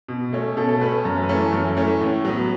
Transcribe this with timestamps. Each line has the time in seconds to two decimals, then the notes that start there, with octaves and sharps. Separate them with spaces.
0.08 B2
0.33 A3 C#4
0.57 B2 A4
0.69 A4
0.81 A3 C#4 B4
1.05 F#2
1.23 B4
1.29 E3 A3 C#4 A4
1.52 F#2
1.77 E3 A3 C#4
2.01 A2
2.25 F#3 B3